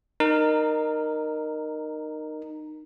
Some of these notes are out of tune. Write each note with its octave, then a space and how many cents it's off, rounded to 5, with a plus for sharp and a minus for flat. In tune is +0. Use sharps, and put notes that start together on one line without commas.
D#4 -20 A#4 +0